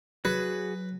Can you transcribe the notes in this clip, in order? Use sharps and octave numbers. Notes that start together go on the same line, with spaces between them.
F#3 F#4 G#4 B4